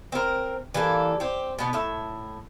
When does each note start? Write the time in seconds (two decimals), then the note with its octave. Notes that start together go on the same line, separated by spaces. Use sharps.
0.12 C4 A#4
0.74 E3 G3 A#3 A4
1.20 C4 G4
1.59 B2 B3 D#4
1.73 A2 E5